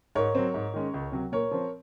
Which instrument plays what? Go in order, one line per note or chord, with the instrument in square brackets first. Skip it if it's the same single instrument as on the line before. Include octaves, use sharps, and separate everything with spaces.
[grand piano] G#2 A#4 C#5
F#3 C4
G#2
D#3 G#3 C#4
C#2
C3 F#3
A#2 A#4 C#5
F3 C4